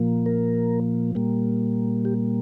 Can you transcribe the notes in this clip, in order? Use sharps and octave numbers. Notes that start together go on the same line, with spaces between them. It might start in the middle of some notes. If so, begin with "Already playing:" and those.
Already playing: A#2 F3 A#3
A#4
A#2 G3 A#3
G4